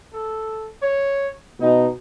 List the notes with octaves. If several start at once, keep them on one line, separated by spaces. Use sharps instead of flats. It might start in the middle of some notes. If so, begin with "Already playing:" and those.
A4
C#5
B2 D#4